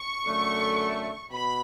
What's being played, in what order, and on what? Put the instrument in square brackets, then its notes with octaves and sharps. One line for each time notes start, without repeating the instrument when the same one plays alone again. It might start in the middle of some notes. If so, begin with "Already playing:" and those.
Already playing: [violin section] C#6
[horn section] F#2 D3 A3
[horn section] B2 [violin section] B5